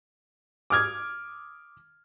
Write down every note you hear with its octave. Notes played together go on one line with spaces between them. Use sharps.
D6 D#6 F6 G#6